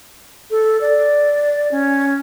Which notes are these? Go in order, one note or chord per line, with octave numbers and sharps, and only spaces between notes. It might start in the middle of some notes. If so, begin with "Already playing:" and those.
A4
D5
C#4